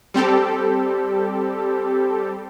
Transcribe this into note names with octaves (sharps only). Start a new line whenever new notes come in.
G3 C4 G4 A4